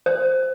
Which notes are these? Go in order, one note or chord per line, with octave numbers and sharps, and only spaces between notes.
C5